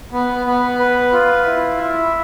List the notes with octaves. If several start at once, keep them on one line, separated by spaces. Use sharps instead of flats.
B3
B3
B4
F4
E4
E5